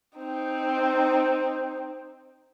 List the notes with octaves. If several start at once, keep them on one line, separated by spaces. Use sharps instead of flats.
C4 D#4